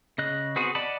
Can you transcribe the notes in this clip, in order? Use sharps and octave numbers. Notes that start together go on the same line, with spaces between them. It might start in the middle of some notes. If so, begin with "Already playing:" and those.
C#3 D#5 F#6
B3 C4 F#4 G#4
D5 D#5 F#5 A5 B5